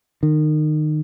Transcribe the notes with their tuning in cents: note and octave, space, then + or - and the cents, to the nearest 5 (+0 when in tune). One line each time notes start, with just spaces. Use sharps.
D#3 -25